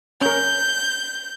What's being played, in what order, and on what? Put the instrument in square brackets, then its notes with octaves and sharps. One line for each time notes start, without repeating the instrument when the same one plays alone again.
[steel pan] C#4 A#4 [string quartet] G6